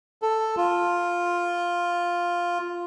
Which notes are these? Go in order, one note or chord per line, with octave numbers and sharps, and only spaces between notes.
A4
F4